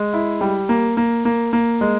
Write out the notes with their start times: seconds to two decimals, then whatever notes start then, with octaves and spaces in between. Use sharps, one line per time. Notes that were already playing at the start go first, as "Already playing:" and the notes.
Already playing: G#3
0.14 E4
0.41 G3
0.69 A#3
0.97 A#3
1.25 A#3
1.53 A#3
1.81 G#3